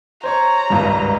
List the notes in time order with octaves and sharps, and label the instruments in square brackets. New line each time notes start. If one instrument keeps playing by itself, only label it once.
[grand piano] C5 C#5 C#6 [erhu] A#5
[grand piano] G#1 C#2 G2